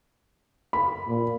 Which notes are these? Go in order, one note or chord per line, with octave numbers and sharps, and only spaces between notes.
B5
A#2